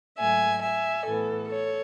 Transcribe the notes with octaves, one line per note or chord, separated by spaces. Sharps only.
G#2 F#3 A3 E5 G#5
E5 G#5
A2 E3 B3 A4
A4 C#5